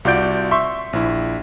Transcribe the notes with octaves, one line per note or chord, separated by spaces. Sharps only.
C2 F4 F#4 D5 G6 D7
E5 C6 C#6
A#1 E4